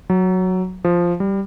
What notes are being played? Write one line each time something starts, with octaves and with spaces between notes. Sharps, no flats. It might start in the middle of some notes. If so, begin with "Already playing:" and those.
F#3
F3
G3